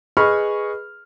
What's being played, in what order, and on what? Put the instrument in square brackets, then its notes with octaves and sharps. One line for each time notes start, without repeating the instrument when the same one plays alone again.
[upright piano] G#4 B4 D#5 B5 C#6 F6